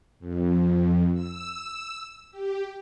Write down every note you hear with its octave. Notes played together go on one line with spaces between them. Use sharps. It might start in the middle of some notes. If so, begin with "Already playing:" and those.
F2
E6
G4